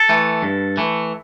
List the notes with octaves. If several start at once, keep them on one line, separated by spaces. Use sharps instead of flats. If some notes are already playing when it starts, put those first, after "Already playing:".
Already playing: A4
E3 A3
G2
E3 A3